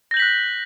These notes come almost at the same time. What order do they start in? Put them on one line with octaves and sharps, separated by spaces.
A#6 G6 F#7 B6 F#6